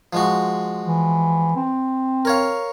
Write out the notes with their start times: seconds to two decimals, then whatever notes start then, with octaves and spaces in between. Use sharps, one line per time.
0.13 F3 G#3 F#4
0.85 E3
1.56 C4
2.25 A#4 C#5 F5